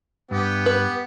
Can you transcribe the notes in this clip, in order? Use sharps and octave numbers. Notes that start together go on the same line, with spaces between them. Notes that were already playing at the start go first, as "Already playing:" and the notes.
G2 B3 G4
B4